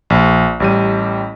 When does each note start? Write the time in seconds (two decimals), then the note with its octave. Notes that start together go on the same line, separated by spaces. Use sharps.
0.10 A#1
0.60 A1 G3 D#7